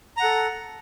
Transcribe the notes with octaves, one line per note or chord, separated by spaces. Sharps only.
A4 F#5 A#5